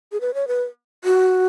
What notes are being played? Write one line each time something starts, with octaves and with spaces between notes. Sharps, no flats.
G#4
B4
C#5
B4
F#4